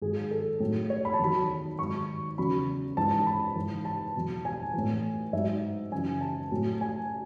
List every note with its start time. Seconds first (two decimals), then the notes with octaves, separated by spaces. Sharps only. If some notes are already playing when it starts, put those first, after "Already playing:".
0.02 G#2 D#3 F#3 G#4
0.31 A4
0.60 A2 F#3
0.90 C#5
1.05 B5
1.14 A5
1.19 E2 D#3 F#3 B5
1.79 G#2 D#3 F#3 C#6
2.38 E2 C#3 F#3 B5
2.97 G#2 E3 A5
3.11 A5
3.26 B5
3.56 G#2 E3
3.85 A5
4.16 E2 B2 F#3
4.45 G#5
4.74 A2 E3
5.33 G#2 F#3 E5
5.92 F#2 C#3 E3 G#5
6.21 A5
6.51 A2 F#3
6.81 G#5